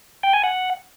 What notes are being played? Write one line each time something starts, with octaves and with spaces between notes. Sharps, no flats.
G5
G#5
F#5